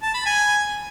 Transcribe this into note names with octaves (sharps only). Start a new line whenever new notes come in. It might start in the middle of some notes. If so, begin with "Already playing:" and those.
A5
B5
G#5